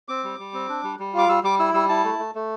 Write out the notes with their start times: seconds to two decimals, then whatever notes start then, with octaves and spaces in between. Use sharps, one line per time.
0.08 C4 D6
0.24 G3
0.39 G3
0.54 C4
0.69 D4
0.84 G3
0.99 G3
1.13 F4 D6
1.29 G3 E6
1.43 G3 D6
1.59 E4 E6
1.74 G3 E6
1.89 E4 A5
2.04 A3
2.19 A3
2.35 A3